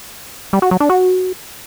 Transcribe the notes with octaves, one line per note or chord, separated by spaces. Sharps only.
G3
F#4
F#3
D4
F#4